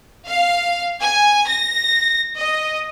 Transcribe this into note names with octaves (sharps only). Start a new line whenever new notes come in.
F5
G#5
A#6
D#5